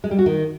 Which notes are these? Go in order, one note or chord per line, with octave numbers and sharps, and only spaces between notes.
G#3
G3
F#4
D#3